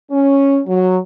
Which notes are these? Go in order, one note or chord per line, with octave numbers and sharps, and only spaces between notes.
C#4
F#3